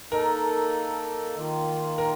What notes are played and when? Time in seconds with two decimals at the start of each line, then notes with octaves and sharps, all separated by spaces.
0.11 A#3 D#4 A4 A#4
1.36 D#3 A#3 F4
1.98 A#4